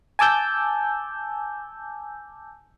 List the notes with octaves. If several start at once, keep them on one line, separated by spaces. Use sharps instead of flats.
G#5 A5 D6 E6 G6